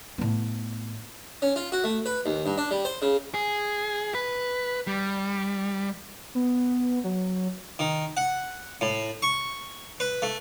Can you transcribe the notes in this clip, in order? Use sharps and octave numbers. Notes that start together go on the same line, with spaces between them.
A2 B3
C#4
F4
F#4
A3
B4
D#2
G2
D4
G3
C5
C#3
G#4
B4
G3
B3
F#3
D#3
F#5
A2
C#6
B4
A3